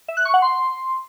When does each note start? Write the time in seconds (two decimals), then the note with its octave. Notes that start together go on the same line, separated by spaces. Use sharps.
0.08 E5
0.17 F#6
0.25 C#6
0.34 F#5
0.42 C6